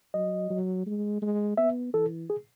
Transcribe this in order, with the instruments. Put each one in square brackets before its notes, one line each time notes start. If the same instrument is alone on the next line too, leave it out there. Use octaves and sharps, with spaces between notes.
[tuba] F#3 [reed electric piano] D#5
[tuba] F#3
G#3
G#3
[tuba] B3 [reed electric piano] E5
[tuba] E3 [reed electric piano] A4
[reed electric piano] G#4